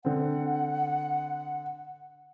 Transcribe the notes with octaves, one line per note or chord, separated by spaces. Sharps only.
D3 C4 F#5